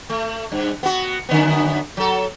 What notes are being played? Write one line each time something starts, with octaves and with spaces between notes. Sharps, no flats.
A3
G2
B3 F#4
F#2 D3 B3
F#3 A4